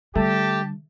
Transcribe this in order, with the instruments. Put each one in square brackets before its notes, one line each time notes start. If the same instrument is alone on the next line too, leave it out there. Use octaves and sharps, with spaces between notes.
[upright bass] D3 G3 [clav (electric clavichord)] A3 [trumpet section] G4 A5